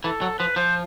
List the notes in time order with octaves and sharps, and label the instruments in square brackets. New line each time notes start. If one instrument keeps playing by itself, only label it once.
[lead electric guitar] E3 [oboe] A4
[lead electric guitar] F#3
[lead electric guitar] F3 [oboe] B4
[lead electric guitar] F3 [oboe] C5